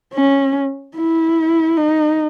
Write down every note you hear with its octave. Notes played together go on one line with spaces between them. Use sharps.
C#4
E4
D#4